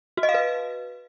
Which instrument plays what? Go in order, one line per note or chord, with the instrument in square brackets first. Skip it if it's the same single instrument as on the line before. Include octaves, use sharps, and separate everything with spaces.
[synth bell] F#4
D#5
F5
B4